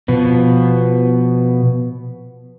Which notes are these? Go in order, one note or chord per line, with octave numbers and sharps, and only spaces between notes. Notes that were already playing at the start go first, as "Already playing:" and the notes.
B2 F3 B3